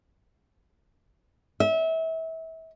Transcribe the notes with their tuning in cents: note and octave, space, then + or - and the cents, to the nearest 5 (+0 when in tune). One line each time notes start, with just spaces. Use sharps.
E5 -30